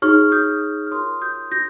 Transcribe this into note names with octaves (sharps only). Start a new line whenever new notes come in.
D#4 G#4 C#5 C#6 F6
D#6 G6
F6
F4 A#4 C#5 C6 D#6
D#6 G6
G6 A#6